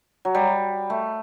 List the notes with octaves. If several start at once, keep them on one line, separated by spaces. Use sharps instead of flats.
F#3
G3
A3